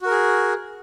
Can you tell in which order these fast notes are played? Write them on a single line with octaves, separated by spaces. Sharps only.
F#4 A#4 G#4